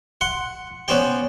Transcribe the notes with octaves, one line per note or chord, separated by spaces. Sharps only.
F#5 C6
B3 C#4 C5 D5 G5